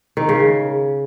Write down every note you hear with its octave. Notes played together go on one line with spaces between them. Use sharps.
D#3
C#3